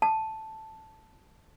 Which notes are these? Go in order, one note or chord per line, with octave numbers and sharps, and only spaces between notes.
A5